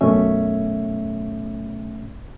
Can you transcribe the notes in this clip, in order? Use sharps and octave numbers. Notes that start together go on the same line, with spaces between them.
F#2 B2 A3 C#4 E5